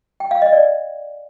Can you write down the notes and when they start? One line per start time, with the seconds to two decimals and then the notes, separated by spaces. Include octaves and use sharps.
0.20 G5
0.31 F5
0.42 D#5
0.53 D5